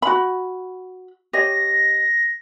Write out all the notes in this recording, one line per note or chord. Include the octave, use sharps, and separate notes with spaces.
F#4 B5
G4 C#5 D#5 A#6